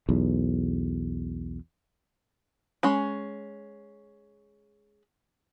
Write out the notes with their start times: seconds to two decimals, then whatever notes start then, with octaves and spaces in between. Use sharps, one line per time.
0.09 B1 E2
2.83 G#3 C#4 B5